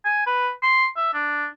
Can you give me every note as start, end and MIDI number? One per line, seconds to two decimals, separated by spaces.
0.05 0.24 80
0.27 0.50 71
0.63 0.87 84
0.97 1.13 76
1.14 1.47 62